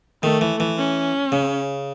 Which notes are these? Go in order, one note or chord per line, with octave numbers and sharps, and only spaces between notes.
D#3 A3
E3
E3
C#4
C#3